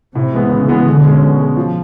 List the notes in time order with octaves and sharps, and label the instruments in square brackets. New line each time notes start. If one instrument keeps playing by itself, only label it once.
[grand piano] A2 [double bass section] C3
[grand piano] E3 G#3 B3
[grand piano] A2 [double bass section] C#3
[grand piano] E3 G#3 B3
[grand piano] B2 [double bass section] D3
[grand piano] G#3 C#4
B2
G#3 C#4
F3